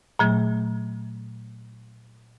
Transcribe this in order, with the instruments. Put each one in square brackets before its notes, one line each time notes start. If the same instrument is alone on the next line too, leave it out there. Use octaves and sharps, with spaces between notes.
[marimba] A#2 F#3 A3